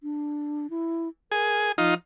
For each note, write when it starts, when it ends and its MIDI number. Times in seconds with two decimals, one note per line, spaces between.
0.03 0.70 62
0.70 1.08 64
1.32 1.72 68
1.32 1.71 70
1.78 1.95 53
1.78 1.94 63
1.78 1.94 65